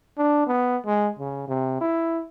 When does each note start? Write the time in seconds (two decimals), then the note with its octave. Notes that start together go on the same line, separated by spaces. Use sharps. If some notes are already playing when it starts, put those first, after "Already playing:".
0.18 D4
0.48 B3
0.86 G#3
1.19 C#3
1.48 C3
1.81 E4